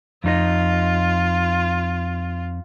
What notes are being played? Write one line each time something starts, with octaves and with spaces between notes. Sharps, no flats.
F2 D#4 F4 D#5